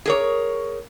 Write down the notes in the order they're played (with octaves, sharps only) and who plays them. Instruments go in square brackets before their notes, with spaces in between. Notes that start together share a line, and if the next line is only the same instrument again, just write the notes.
[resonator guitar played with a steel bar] G#4 A#4 C#5